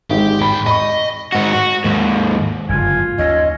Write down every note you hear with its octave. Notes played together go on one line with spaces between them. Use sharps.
G#1 G#3 G4
G#2 G5 B5
D#5 B5 C#6
G#2 F#4
F#4
D#2 G#2
F#1 G2 D3 F4 G#5
D#2 C#4 D#5